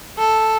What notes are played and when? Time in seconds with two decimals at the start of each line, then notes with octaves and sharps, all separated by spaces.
0.18 A4